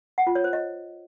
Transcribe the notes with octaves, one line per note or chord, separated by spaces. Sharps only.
F#5
F4
C#5
C5
D#5